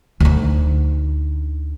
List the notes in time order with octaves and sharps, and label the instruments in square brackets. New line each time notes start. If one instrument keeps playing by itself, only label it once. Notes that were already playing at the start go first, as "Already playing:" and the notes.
[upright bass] D2 D#4